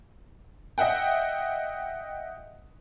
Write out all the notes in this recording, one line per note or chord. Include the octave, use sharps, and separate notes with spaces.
D#5 E5 F#5 G5